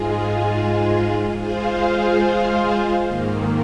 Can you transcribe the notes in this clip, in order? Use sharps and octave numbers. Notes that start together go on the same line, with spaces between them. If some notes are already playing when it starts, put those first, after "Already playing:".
Already playing: G#2 G#3 F4 G#4
G#3 F4 G#4 C5 F5
G#2 D#3 A#3